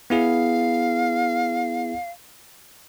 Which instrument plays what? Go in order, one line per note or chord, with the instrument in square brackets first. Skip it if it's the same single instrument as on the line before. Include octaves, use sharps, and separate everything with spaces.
[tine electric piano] B3 E4 G#4 [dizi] F5